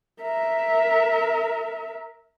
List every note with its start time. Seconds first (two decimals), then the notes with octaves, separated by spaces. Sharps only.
0.22 A#4 E5